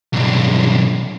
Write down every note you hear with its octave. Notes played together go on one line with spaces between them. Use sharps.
B1 G2